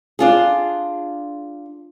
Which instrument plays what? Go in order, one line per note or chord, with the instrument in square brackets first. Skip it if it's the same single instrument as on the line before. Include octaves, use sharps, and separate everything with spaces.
[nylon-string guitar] D4 F4 G#4